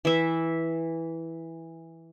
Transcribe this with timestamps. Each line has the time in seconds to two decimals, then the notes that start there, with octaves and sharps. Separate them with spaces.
0.05 E3 E5